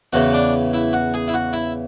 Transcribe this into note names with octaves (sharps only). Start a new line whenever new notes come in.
E2 C#3 E3 F#4
D4
E4
F#4
G#4
E4
F#4
E4